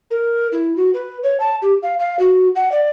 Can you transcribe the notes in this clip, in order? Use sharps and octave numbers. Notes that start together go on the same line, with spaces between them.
A#4
E4
F#4
B4
C#5
A5
G4
F5
F5
F#4
F#5
D5